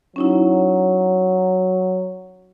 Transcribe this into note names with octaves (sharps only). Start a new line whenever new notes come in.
F#3 C#4 D#4 E4